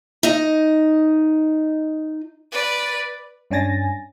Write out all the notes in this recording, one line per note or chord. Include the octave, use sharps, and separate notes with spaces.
D#4 D#5
B4 D5
G2 C#4 D4 G#5 A6 A#6